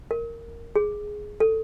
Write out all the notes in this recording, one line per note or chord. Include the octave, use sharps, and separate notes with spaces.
A#4
G#4
A4